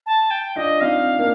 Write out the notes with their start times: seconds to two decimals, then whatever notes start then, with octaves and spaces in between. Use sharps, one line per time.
0.06 A5
0.31 G5
0.56 D4 F4 D#5
0.81 C4 D#4 F5
1.19 A#3 D4